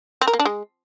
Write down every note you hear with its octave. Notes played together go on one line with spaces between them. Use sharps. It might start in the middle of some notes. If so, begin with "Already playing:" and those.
C4
A#4
A#3
D4
G#3